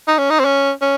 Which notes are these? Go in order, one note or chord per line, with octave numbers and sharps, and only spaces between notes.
D#4
C#4
D#4
C4
C#4
C#4